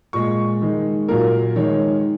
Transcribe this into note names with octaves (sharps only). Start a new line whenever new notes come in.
A#2 G#3 C#6
D#3 G#3
A#2 F#3 A#3 A#4
D#3 G#3 C#5